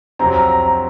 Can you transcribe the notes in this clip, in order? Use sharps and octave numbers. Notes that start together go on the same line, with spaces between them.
F2 C3 F#3 C4 A#5
A#5
A#5
A#5